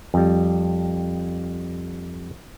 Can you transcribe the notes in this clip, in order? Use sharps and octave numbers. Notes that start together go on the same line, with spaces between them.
F2 G3